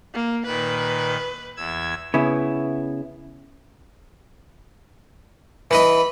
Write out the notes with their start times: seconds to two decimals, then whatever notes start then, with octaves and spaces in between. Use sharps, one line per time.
0.14 A#3
0.46 A#2 D#3 B4
1.57 E2 E6 G#6
2.14 C#3 B3 E4
5.71 E3 B4 D#5 B5